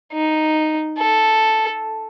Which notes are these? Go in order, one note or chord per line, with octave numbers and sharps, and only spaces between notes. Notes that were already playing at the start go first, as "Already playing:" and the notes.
D#4
A4